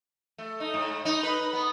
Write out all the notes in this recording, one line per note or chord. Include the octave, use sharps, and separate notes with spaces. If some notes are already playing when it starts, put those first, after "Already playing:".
A3
D#4
G#2
D#4
B4
B3